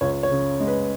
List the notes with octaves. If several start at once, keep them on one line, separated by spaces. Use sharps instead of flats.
C#2 C#5
C#5
C#3
G#3
B4